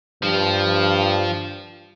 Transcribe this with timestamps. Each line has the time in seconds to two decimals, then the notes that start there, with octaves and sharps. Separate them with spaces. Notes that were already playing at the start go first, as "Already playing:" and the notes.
0.23 G2 F3